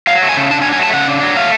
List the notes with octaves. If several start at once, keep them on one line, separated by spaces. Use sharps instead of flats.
F#3 F5
A3
G#5
C#3
D4 A5
G#5
F#3
G#5
A3 A5
C#3 F#5
D4
F#3
A3 F5